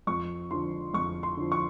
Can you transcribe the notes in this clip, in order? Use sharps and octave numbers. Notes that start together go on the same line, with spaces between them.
F2 C#6
D3 F3 C6
F2 C#6
C6
D3 F3
C#6